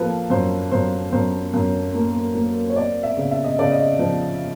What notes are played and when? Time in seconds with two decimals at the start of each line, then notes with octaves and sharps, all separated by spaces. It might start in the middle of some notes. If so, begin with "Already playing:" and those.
Already playing: F3 A#3 A4 B4
0.30 F#2 C5
0.71 F#2 C5
1.12 F#2 C5
1.54 F#2
1.95 A#3
2.35 A#3
2.70 C#5
2.76 C4 D5
3.03 E5
3.17 C#3
3.31 E5
3.44 D#5
3.59 C#3 D5
3.72 D#5
3.99 F3